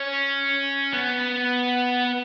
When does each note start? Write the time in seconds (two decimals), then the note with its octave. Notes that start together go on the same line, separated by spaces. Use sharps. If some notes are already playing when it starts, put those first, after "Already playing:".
Already playing: C#4
0.93 B3